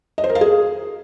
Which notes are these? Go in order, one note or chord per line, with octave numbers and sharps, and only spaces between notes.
D#5
C5
A#4
F5
G#4